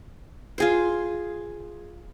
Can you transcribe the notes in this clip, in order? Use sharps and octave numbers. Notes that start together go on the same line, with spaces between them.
F4 G#4 C5